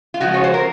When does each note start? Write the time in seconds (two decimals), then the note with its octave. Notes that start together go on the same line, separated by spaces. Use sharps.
0.14 F4
0.20 C#3 F3 G#3 F#4
0.34 C#5
0.44 C5
0.54 A#4